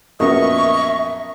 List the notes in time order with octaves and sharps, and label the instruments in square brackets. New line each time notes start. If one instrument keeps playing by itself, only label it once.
[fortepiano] A#1 F#2 B3 [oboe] D#5 [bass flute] E5 [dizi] C#6